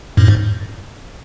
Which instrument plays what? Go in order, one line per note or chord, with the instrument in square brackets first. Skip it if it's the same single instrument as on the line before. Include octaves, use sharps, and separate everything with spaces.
[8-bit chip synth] F#2 A2
G#2